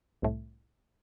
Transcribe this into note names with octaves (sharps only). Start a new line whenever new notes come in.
C2 A2